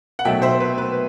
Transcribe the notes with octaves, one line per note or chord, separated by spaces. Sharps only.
F#5
B2 F#3 A3 D#4 E5 G5
C5 E5
B4
B4